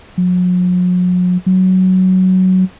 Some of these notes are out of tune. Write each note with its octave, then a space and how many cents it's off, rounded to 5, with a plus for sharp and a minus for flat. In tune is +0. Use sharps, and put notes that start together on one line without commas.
F#3 -45
F#3 +10